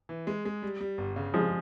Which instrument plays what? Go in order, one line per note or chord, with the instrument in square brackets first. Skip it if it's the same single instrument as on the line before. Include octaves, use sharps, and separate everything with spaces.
[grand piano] E3
G#3
G#3
G3
G3
G1
C#3
[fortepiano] F3 G#3 [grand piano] G3